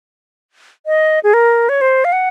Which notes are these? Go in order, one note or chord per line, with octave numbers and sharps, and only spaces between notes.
D#5
G#4
A#4
C#5
C5
F5
F#5